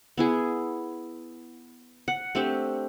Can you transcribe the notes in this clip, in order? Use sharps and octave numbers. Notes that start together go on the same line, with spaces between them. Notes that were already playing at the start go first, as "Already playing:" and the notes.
B3 E4 G#4
F#5
A3 C4 D4 G4